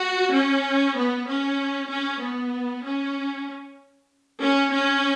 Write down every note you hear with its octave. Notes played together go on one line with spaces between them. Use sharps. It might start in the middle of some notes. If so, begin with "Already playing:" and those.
Already playing: F#4
C#4
B3
C#4
C#4
B3
C#4
C#4
C#4